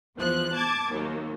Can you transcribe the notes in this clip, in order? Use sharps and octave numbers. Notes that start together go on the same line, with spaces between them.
E2 F3 F#6
A5 D6 G#6
D#2 F#3 A#3